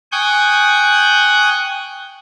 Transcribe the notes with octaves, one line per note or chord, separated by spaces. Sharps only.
G5 G#5 C#6 D#6 F#6 G6